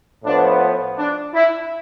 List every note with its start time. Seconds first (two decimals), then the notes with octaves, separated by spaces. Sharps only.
0.24 A2 F3 B3 D4
0.98 D4
1.34 E4